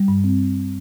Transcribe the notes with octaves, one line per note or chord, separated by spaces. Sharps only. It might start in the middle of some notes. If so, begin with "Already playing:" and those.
Already playing: G3
G2
C4